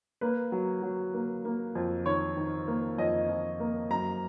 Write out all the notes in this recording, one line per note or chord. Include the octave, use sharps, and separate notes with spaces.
A#3 B4
F#3
F#3
A#3
A#3
F2
D#3 C#5
D#3
A#3
F2 D#5
F2
A#3
F#2 A#5